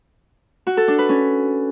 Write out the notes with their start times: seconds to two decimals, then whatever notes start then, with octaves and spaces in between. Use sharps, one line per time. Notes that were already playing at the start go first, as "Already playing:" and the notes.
0.67 F#4
0.77 A4
0.88 D4
0.98 B4
1.09 C#4